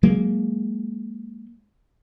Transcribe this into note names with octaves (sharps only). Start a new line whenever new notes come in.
F#3 G#3 A#3